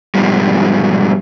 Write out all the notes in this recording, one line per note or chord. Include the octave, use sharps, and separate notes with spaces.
G#2 B2 F3 G3